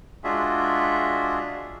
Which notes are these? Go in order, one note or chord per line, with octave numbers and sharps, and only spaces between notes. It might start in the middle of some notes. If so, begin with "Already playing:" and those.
G#3 D4 F4 F#4 G#4 E5